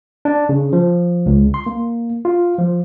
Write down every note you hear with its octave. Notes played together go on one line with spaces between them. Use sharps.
D4
C#3
F3
C#2
C6
A#3
F4
F3